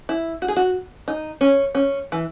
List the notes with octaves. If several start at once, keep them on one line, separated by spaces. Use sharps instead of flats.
E4
F#4
G#4
F#4
D#4
C#4
C#4
E3